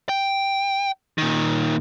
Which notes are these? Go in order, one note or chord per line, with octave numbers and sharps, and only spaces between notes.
G5
A#2 D#3